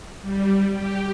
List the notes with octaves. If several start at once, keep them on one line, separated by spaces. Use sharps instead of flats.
G3
G4